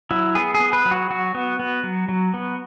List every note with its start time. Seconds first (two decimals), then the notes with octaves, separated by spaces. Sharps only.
0.11 F#3 E4
0.35 B3 G#4
0.54 G#4
0.60 B3
0.73 B4
0.86 F#3
0.91 F#4
1.10 F#3 F#4
1.35 B3
1.60 B3
1.84 F#3
2.09 F#3
2.34 B3